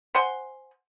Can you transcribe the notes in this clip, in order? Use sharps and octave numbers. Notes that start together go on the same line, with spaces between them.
C5 F#5 G#5 C6